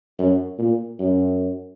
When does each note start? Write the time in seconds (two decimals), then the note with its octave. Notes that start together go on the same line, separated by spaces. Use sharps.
0.18 F#2
0.59 A#2
0.99 F#2